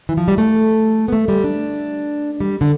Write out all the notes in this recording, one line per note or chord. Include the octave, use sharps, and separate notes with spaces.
E3
F3
G3
A3
B3
A3
G3
D4
G3
D3